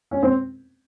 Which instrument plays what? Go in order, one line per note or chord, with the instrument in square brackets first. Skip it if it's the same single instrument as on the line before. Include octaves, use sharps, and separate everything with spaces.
[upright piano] C#4
C4